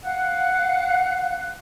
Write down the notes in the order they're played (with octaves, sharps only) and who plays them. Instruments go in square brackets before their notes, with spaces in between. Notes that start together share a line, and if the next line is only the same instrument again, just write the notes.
[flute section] F5 F#5 F#6